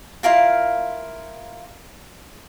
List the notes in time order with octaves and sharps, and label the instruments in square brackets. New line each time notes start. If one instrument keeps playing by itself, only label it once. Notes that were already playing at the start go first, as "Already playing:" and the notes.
[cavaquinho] E4 F4 A#4 F5